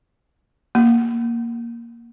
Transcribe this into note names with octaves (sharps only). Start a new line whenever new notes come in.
A#3